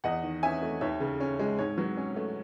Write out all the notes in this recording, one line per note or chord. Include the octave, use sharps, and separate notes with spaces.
E2 D#5 F#5
D#3
C#4 E5 G#5
A3
D#2 C#5 E5
C#3
C#4
G#3
G#2 C#5
F#3
C#4
A3